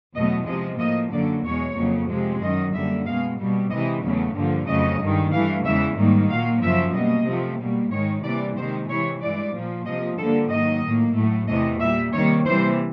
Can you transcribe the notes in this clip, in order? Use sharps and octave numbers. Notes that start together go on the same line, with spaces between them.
E2 B2 F#3 A3 D#5
C3 F3 G#3 D#5
A2 F3 A#3 D#5
F#2 D3 F#3 A#3 D5
E2 B2 G#3 C#5
F2 C#3 F#3 A#3
C3 F3 G#3
F#2 D#3 F#3 D#5
F#2 D3 G3 A#3 E5
B2 G#3 F5
B2 G3 A#3
C3 E3 G#3 D#5
E2 C#3 F#3 A3
G2 D3 F3 A#3
F2 C#3 F#3 A3 D#5
G2 D#3 G#3
G2 E3 A3 F5
E2 C#3 E3 G#3 E5
G#2 D#3 G3 A#3
A#2 F#3 A#3 F5
F#2 C#3 F3 E5
B2 G3 A#3 D#5
C3 F3 A3
B2 G3 A#3
G#2 D#3 G#3 C#5
C3 E3 G3 A#3 D5
C3 D#3 G#3 C5
C3 E3 G#3 C#5
G2 E3 G#3 D5
A#2 F3 A#3
C3 F3 A#3 D#5
G2 D3 F3 A#3 A4
G#2 D#3 F#3 A#3 D#5
A2 F#3 A#3
A2 F#3 A3
E2 C3 E3 A3 D#5
A#2 G3 A#3 E5
C3 D#3 G3 A#3 C#5
C3 E3 G3 A#3 C5